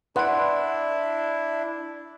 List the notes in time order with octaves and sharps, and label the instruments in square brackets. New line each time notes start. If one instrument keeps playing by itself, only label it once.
[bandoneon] D4 E4 [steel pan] B4 F#5 [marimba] D5 C6